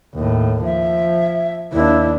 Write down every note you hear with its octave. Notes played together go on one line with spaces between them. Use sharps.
D#2 A2
F3 E5
D#2 D4 E4